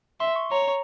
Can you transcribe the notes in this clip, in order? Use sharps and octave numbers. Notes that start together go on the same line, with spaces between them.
E5 C6
C#6
C#5 A#5